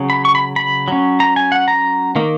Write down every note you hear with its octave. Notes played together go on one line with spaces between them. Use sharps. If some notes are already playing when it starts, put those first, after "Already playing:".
Already playing: C#3 F#3 C#4
B5
C#6
B5
B5
F#3 C#4
A#5
G#5
F#5
A#5
D#3 A#3